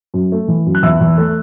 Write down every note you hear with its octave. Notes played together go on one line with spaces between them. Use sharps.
F#2
A3
E3
F#2
F#6
E2 E5 E6
E2
A3